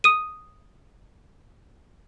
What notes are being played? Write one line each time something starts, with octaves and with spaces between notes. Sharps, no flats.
D#6 D#7